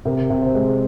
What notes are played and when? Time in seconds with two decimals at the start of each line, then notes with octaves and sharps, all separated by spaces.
0.05 C3 A#4
0.30 C3
0.42 C5
0.55 G#3